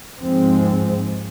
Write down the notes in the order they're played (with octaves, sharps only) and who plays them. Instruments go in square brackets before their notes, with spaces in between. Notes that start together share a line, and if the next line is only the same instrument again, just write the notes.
[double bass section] D#2 G#2 F3 G#3 C4